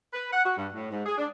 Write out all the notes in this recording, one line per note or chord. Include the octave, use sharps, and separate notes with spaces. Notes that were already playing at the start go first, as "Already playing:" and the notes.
B4
F#5
F#4
G2
A2
G#2
G#4
D4